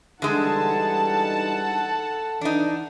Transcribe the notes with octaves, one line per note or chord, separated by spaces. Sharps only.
D3 E3 G3 G#3 D#4 A4 F#5 A5
E3 D4 D#4